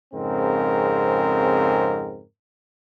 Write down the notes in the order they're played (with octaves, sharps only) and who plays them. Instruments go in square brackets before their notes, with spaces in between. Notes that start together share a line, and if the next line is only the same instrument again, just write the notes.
[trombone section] F2 G#2 C#3 C4 A#4